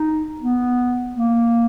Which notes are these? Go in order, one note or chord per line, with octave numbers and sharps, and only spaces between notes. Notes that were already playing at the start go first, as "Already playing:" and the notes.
Already playing: D#4
B3
A#3